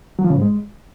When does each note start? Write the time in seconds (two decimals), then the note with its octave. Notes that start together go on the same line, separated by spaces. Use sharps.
0.19 F#3
0.24 F3
0.30 C#3
0.36 G#2
0.41 G#3